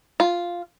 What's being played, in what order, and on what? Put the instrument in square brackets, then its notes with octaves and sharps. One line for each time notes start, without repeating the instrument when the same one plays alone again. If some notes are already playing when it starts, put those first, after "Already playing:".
[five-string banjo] F4